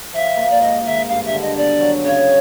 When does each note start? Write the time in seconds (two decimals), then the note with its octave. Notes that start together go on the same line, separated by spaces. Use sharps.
0.13 F3 E5
0.37 A#3
0.50 D5
0.61 G#2 D#5
0.85 D#3 E5
1.09 G2 F5
1.25 E5
1.33 D3
1.41 D#5
1.57 B2 D5
1.81 F#3
2.04 C#3 C#5